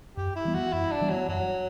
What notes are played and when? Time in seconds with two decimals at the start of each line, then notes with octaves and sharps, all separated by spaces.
0.17 F#2 G4
0.36 E4
0.45 E3 G3 B3
0.54 F#4
0.73 F#2 E4
0.91 D4
1.01 E3 G3 B3
1.10 F#3
1.28 F#2 F#3